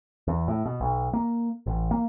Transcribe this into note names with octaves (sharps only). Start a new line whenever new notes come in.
E2
A2
B2
B1
A#3
A1
A#3